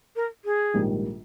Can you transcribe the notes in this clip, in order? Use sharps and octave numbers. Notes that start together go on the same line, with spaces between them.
A#4
G#4
A#1 G#2 D#3 G3